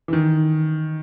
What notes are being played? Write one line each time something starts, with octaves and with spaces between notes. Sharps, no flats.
E3
D#3